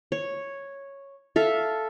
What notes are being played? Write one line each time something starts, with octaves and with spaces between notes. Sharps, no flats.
C#5
A4 E5 F5